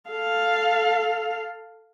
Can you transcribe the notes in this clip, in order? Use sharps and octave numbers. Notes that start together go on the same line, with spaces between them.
A4 F5